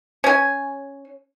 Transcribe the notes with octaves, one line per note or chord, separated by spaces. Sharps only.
C#4 G#5